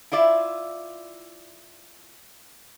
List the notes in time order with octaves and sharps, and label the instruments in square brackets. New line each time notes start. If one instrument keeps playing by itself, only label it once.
[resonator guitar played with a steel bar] E4 F4 D5 E5